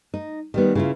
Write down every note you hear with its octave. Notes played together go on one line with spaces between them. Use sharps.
D#4
D#3 G3 B3
C#3 E4 F4